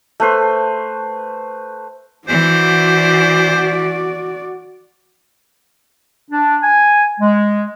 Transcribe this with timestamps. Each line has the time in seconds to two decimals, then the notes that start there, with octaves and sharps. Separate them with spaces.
0.20 A3 B4 C5
2.28 E3 F#4 C5 D5
6.30 D4
6.62 G#5
7.20 G#3